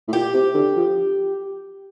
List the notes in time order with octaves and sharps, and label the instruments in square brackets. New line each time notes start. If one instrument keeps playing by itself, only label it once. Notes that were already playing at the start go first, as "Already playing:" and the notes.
[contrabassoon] A2
[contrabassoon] A#2 [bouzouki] G4
[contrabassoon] C3
D3
F3